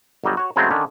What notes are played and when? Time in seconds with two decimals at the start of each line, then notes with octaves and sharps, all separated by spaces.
0.24 G1 F#3 G3 D#5
0.37 F#4 C#5
0.56 F#2 C#3 F#3 G#3 A3 C4
0.71 D3 D#3 C#4 D4